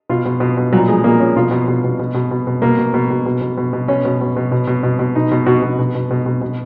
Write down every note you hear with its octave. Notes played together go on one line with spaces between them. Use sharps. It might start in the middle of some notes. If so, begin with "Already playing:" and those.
B2 F4
B2
B2
B2
A#2 F#3
F3 G#3
A#2 A#3
F3 C#4
B2 F4
B2
B2
B2
B2
B2
B2
B2
B2 A#3
B2
B2
B2
B2
B2
B2
B2
B2 C#4
B2
B2
B2
B2
B2
B2
B2
B2 D#4
B2
B2 F#4
B2
B2
B2
B2
B2
B2